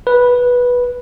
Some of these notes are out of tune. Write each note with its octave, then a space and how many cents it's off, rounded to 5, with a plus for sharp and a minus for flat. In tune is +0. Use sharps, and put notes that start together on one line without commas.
B4 -10